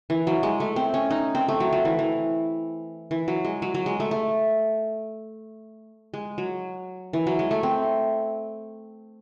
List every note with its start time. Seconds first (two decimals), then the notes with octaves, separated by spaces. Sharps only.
0.10 E3
0.27 F#3
0.43 G#3
0.60 A3
0.76 C4
0.94 C#4
1.10 D#4
1.35 C4
1.48 A3
1.60 F#3
1.73 F#3
1.85 E3
1.99 E3
3.11 E3
3.28 F#3
3.45 G#3
3.62 F#3
3.75 F#3
3.86 G#3
4.00 A3
4.11 A3
6.14 G#3
6.38 F#3
7.13 E3
7.27 F#3
7.39 G#3
7.51 A3
7.63 C4